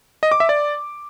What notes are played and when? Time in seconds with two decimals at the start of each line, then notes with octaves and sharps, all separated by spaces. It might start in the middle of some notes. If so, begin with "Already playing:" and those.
0.23 D#5
0.32 D6
0.40 E5
0.49 D5